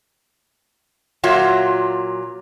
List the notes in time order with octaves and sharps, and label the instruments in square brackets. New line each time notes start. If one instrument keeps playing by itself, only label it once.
[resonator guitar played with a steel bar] A#2 F#3 F4 E5